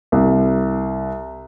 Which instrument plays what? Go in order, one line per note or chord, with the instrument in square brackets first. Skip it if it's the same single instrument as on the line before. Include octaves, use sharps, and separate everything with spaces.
[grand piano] C2